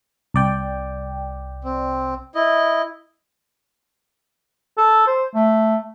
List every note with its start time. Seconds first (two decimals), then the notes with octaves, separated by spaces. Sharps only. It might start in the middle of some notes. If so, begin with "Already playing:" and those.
0.34 C2 D5 G5
1.64 C4
2.35 E4 D#5
4.78 A4
5.07 C5
5.35 A3